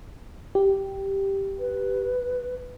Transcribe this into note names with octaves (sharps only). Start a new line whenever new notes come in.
G4
B4